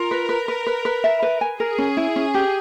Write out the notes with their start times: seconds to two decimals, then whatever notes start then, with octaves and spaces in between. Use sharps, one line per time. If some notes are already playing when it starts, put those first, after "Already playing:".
Already playing: F4 A#4
0.11 B4
0.29 B4
0.48 B4
0.67 B4
0.85 B4
1.04 E5
1.22 B4
1.41 G#5
1.60 G#4 A#4
1.78 C#4
1.97 E4
2.16 C#4
2.34 G4